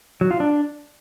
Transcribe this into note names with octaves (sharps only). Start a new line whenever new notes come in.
F#3
F4
D4